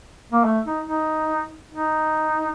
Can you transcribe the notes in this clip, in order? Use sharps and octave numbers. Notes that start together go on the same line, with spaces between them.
A#3
A3
D#4
D#4
D#4